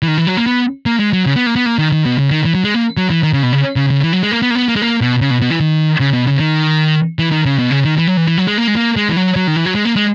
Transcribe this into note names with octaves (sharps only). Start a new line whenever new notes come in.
E3
D#3
E3
F#3
A#3
B3
A#3
G#3
F#3
C#3
B3
A#3
B3
A#3
D#3
D#3
B2
C#3
D#3
E3
F#3
G#3
A#3
F#3
E3
D#3
C#3
B2
C#3
C#3
C#3
E3
F#3
G#3
A#3
B3
A#3
B3
A#3
G#3
A#3
B2
C#3
B2
B2
E3
D#3
C#3
B2
C#3
D#3
E3
D#3
C#3
B2
C#3
D#3
E3
F#3
E3
E3
F#3
G#3
A#3
G#3
A#3
G#3
E3
F#3
F#3
D#3
E3
F#3
G#3
A#3
G#3